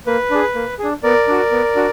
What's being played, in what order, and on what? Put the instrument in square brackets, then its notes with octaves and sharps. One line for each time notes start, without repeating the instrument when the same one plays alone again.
[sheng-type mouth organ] A#3 B4
D4 G#4
A#3
D4 G#4
B3 A#4 D5
D4 F#4
B3
D4 F#4